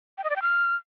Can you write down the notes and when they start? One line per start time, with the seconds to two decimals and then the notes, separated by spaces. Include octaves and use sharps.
0.18 G5
0.24 D#5
0.30 D5
0.36 G5
0.42 F6